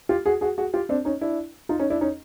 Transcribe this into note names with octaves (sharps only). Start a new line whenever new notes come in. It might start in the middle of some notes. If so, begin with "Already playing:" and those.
F4 G4
F#4 G#4
F#4 G#4
F#4 G#4
F4 G4
C4 D4
C#4 D#4
D4 E4
D#4 F4
C#4 D#4
D4 E4
C#4 D#4